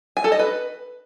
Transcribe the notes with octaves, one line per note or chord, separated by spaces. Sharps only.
G#5
A4
D#5
B4